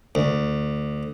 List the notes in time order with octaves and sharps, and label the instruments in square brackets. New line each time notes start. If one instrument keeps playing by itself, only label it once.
[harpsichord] D2